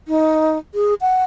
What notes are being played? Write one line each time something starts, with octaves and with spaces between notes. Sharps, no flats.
D#4
G#4
F#5